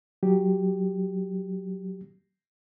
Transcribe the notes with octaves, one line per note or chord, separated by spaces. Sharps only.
F#3 G4